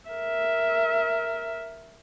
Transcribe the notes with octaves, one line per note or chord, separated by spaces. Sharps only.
A#4 E5